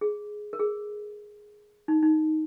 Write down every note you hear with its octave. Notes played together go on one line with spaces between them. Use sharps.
G#4
A#4
G#4
D#4
D#4